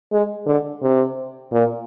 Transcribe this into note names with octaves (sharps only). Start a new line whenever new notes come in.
G#3
D3
C3
A#2